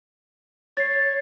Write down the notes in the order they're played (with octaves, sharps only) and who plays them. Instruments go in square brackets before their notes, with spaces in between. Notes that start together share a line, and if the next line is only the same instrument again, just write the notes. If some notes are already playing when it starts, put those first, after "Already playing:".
[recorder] C#5 [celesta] A6 C7